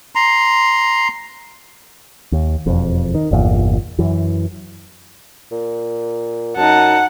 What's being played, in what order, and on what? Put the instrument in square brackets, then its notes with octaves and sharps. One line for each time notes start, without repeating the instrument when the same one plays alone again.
[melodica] A#5 C6
[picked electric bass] D#2
E1 F2
D#3
G1 E2 A#2
F#2 E3
[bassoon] A#2
[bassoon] F#2 [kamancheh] D#4 A5 [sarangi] F#5